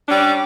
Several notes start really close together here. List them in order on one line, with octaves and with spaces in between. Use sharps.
D4 C#4 G3